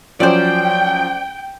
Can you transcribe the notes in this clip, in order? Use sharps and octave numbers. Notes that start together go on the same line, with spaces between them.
F3 F#3 C#4 C5 D5 G5